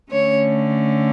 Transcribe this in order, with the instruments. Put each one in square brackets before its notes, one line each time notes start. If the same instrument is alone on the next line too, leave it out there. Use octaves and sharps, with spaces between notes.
[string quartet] D3 A3 C#4 C#5